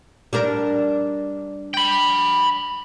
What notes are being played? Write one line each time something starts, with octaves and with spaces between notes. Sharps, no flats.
G3 D4 A#4
G5 B5